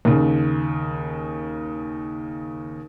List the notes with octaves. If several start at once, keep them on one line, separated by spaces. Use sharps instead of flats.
D#2 C#3